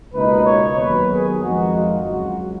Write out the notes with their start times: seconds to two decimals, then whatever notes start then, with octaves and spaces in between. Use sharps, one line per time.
0.13 C#2 B2 A#3 D#4 B4
0.45 C#5
0.78 D#2 D#3 F#3 B3 B4
1.11 G#4
1.43 F2 D#3 G#3 D#4 F#4
1.75 F4
2.08 C#2 C#3 F#3 F#4